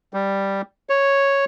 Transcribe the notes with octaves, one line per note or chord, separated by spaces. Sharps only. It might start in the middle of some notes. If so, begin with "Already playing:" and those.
G3
C#5